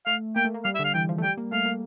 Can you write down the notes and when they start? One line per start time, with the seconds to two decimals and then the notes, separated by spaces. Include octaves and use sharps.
0.06 A3 F5
0.36 A#3 G5
0.45 A3
0.54 A#3
0.64 G3 F5
0.75 E5
0.79 D3
0.84 F5
0.94 E3 G5
1.09 F3
1.18 A3
1.23 G3 G5
1.37 A#3
1.52 A3 F5
1.65 A#3